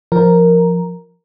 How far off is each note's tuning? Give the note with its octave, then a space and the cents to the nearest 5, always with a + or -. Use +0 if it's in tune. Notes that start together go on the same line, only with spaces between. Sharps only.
F3 +0 A#4 +0